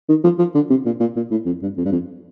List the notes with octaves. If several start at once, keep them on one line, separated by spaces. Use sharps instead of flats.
D#3
F3
F3
D3
C3
A#2
A#2
A#2
A2
F2
G2
F2
G2
F2